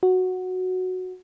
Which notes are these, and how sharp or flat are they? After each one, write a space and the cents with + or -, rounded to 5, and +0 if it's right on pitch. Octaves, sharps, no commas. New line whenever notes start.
F#4 -5